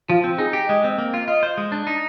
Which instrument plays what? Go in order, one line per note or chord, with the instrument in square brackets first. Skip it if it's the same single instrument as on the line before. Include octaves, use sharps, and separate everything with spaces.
[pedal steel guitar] F3 [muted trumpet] F4
[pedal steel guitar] C4
[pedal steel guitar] D#4 [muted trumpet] G#4
[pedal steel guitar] G4
[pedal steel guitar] G#3 [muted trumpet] D#5
[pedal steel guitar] C4
A#3
F4
[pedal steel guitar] F4 [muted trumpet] D#5
[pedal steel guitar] C5
G#3
D4
D#4